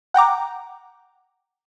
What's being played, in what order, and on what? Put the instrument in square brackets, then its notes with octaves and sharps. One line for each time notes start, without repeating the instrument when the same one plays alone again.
[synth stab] F#5 G5 A#5 D6